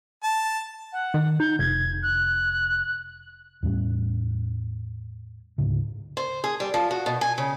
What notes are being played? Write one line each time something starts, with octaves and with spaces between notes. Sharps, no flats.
A5
F#5
D#3
D#4 G6
F1 G#6
F#6
E2 A2 G3 C#4
D2 G#2 C#3
C5
G#4
G3
F3
F#4
B2
G#5
C#3